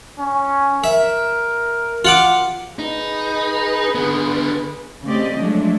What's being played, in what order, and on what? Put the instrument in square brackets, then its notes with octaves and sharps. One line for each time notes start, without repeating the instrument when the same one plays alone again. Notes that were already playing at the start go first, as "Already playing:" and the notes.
[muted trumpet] C#4
[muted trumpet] A#4 [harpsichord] E5
[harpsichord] F4 F#5 D6
[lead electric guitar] D#4 [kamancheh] G#4 B4
[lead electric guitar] D3 B3
[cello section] C#3 A3 C4 G4 D5 D#5
F3 F#3 G#3 A3 D4